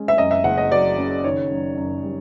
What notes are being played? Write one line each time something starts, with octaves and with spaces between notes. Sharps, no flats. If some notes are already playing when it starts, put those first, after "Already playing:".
Already playing: G#3 C#4
E5
F#2 D#5
E5
F#1 F#5
D#5
F#3 D5
C#3
D#3 C#5
F#2
F#2
G3